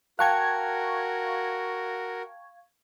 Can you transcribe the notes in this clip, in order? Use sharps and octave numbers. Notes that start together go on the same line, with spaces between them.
F#4 A#4 F5 G5 A5 C#6 F#6 G#6